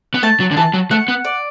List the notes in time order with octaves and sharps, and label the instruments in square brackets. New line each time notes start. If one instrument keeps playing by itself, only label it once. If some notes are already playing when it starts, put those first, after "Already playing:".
[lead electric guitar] B3
[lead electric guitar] A3 [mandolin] A5
[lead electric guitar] F#3
D3
[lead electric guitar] E3 [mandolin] A5
[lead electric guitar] F#3
[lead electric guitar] A3 [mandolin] F#5
[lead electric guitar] B3
[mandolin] D5